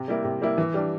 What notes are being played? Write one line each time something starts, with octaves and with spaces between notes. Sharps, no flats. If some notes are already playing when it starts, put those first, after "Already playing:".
Already playing: C3
G3 A#3 E4
C3
G3 A#3 E4
E3
G3 D4